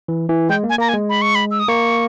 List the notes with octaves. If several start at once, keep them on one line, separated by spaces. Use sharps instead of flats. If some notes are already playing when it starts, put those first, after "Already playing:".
E3
E3
G#3 G5
A#3
G#5
A#3 A#5
G#5
G#3
B5
C#6
B5
E6
D#6
A#3 C#6